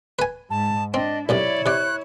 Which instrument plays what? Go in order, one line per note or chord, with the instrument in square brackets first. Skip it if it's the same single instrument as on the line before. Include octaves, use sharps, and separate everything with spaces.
[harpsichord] B4 G#5
[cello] G#2 [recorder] A5
[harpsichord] C4 [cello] D4 [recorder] D#5
[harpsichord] B1 F#2 C3 [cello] E4 C#5 [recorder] D5
[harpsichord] C3 D5 [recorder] F#6